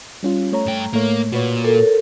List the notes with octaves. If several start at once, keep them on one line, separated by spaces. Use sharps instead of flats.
G3 C#4 F4
A3 C#5 A#5
G2 G5
A2 A3 A#3 C#5
A#2 F#4 B4 C#5
A4 A#4